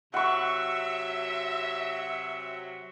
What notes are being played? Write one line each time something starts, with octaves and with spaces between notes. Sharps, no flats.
C3 F#3 E5 F#5 C#6